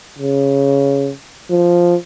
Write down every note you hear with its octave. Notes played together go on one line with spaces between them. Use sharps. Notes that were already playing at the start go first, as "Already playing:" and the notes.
C#3
F3